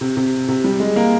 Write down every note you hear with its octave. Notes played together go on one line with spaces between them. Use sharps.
C3
C3
C3
G3
G#3
A#3